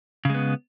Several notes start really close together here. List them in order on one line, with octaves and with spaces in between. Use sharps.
C#3 G#3 B3